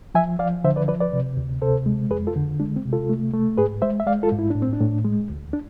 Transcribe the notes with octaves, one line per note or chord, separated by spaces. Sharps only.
F3 E5 G#5
F3 D5 F5
D3 C5 E5
B4 D5
F3 B4 D5
B4 D5
C3
D2
C3 A4 C5
G#3
F2 G#4 B4
F4 A4
D3
G#3 D4
C4
C3
F4 A4
A3
A3
G#2 G#4 B4
G#3 C5 E5
E5
G#3 D5 F5
F4 A4
G#2
E4
A2 D4
C4
D4
A2
G#3
D2
D4